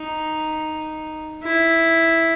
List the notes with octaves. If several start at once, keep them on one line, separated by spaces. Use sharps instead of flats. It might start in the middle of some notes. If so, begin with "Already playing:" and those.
Already playing: D#4
E4